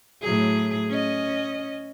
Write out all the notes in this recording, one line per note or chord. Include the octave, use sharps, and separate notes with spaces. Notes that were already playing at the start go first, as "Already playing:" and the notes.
A2 F#3 G#4
C#4 D#5